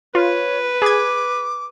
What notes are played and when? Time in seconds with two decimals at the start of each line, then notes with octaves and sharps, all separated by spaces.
0.15 F4 B4 C#5
0.82 G#4 D6 G#6